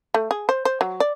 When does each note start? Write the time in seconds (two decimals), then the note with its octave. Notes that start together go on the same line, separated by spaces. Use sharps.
0.14 A3
0.31 G#4
0.49 C5
0.65 C5
0.81 F#3
1.00 D5